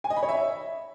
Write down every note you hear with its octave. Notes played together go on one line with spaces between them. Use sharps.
G#5
D#5
B5
C#5
E5